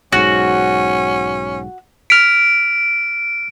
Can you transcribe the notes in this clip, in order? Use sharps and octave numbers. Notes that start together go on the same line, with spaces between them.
B1 G#2 C#4 F#4
F6 B6 D7